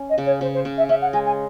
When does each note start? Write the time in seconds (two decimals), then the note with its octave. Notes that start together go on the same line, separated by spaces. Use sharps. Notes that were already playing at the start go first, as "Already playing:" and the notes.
Already playing: C#4
0.09 D#5
0.18 C#3
0.26 C#5
0.41 C#3 C5
0.54 C5
0.65 C#3
0.77 E5
0.89 C#4 E5
1.01 F#5
1.13 G#3 G#5
1.25 G#5